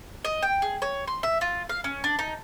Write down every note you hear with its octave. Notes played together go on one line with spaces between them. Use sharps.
D#5
G5
G#4
C#5
C6
E5
F4
F5
C#4
D4
D#4